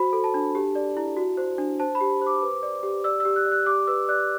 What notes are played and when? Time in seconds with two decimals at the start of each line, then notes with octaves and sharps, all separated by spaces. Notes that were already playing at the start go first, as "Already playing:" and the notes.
Already playing: F#4 C5 B5
0.13 A4
0.24 A5
0.34 D4
0.55 G4
0.75 D5
0.97 E4
1.17 F#4
1.37 C5
1.58 D4
1.80 C5 A5
1.95 B5
2.00 G4
2.21 C5
2.27 D6
2.42 B4
2.63 D5
2.83 G4
3.04 D5 E6
3.20 E6
3.25 G4
3.36 F#6
3.46 D5
3.52 F#6
3.66 G4 D6
3.87 B4 E6
4.08 D5 F#6